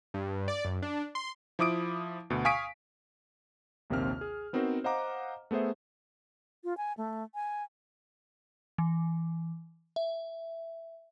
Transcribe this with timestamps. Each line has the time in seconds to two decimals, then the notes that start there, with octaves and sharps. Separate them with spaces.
0.14 G2
0.48 D5
0.65 F#2
0.82 D4
1.15 C6
1.59 F3 E4 D6 D#6 D7
2.30 D2 B2
2.45 F5 G#5 C#6 D#6 B6 D7
3.90 A#1 D#2 C3 A#3 C4 F6
4.21 G#4
4.53 B3 C4 D#4 F#4 A#4 C5
4.84 C5 D#5 F5 F#5 A#5 D6
5.51 A3 B3 G#4 C5 E5
6.64 F4
6.77 G#5
6.98 A3
7.35 G#5
8.78 E3
9.96 E5